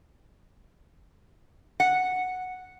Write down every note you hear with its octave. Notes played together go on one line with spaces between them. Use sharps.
F#5